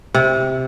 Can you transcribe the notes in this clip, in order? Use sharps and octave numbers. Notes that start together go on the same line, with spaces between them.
C3